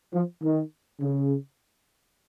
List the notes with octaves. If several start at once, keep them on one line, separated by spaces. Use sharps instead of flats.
F3
D#3
C#3